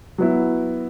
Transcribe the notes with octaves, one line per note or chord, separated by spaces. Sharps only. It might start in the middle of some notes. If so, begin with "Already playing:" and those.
F#3 B3 E4